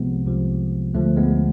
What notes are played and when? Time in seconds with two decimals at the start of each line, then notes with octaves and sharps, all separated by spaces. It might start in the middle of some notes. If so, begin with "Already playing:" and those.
Already playing: C2 C3 F3 G#3 B3
0.26 C2 C3 F3
0.94 D2 D3 F3 A3
1.17 G#3 B3